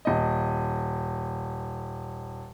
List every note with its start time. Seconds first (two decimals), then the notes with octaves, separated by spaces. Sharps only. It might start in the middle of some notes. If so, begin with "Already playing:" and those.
0.05 D#1 D#5